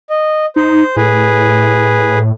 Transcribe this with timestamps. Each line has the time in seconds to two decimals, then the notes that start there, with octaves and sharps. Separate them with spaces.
0.10 D#5
0.56 D#4 C5
0.96 A2 G#4 B4